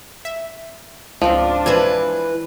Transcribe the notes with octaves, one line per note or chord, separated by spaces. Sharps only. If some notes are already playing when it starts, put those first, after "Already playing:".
E5
C#2 G#2 F3 C4 D4 F4
E3 B4 C5 G#6